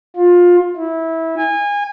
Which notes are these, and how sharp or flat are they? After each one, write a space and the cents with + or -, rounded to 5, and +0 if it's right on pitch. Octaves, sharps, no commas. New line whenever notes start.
F4 +20
E4 -20
G#5 -25